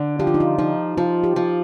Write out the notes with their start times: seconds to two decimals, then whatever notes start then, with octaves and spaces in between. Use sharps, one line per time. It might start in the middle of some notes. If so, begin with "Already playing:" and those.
Already playing: D3
0.19 F3 G4
0.27 F4
0.34 D#4
0.40 F4
0.58 F3 D#4
0.97 F3 F4
1.24 G4
1.36 F3